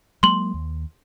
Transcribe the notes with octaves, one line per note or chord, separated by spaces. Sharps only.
F#3 G#3 A#3 C6 F#7
D#2